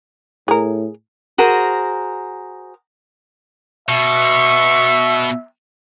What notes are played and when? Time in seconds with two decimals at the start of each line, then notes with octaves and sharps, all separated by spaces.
0.48 A2 G#4 A#4
1.38 F#4 G#4 A#4 C5
3.89 B2 E5 C#6